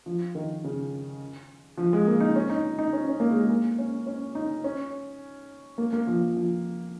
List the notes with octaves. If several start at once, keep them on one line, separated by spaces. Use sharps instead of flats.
F3
D#3
C#3
F3
G#3
A#3
D#4
C#4
D#4
D#4
C#4
C#4
A#3
G#3
G#3
A#3
C#4
C#4
D#4
C#4
A#3
A#3
F3
F3
F3